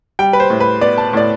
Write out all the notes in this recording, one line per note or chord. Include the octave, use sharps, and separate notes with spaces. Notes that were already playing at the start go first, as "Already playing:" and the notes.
G3 G5
B4
C5
A2
B4
B3 D5
A5
A2 D5